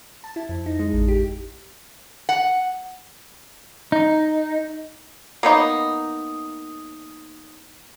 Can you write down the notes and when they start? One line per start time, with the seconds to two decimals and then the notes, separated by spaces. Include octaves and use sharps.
0.24 A5
0.36 E4
0.49 F2
0.66 D#4
0.79 G#3
0.93 A1
1.08 G4
2.29 F#5
3.92 D#4
5.43 A#3 B3 D#4